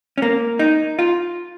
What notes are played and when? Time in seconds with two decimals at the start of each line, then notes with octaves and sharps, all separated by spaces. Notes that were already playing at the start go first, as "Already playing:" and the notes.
0.18 C#4
0.22 A#3
0.59 D#4
0.99 F4